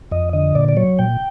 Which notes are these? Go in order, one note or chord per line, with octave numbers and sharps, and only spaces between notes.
F2 D#5
D3 D#5
A#2 D5
D5
F#3 C#5
A#2 G5